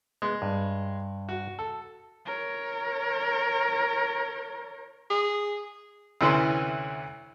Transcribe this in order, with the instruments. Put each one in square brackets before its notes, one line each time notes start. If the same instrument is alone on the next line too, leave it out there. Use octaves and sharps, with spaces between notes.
[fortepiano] G#3 [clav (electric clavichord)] B3
[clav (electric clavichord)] G2
[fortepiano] F#4
A4
[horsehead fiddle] A#4 C#5
[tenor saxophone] G#4
[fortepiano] D2 C3 E3 C#4 E4 C6